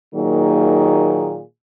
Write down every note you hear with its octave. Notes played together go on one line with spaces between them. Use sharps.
A#2 D#3 F#3 A#3 D#4 G#4